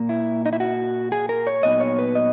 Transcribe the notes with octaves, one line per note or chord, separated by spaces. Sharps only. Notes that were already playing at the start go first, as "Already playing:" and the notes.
Already playing: A#2 A#3
E4
D#4
E4
F#4
G#4
A#4
C#5
A#2 F#3 B3 D#4 D#5
C#5
B4
D#5